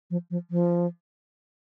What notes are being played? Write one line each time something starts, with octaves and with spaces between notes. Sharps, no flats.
F3
F3
F3